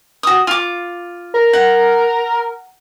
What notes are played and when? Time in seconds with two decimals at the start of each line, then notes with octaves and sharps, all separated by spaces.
0.23 F#4 D#6
0.47 F4 D6
1.34 A#4
1.53 F#5